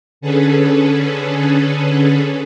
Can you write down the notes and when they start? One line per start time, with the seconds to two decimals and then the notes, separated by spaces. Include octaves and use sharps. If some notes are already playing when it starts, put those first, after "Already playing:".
0.21 D3 C#4 G#4 A4 B4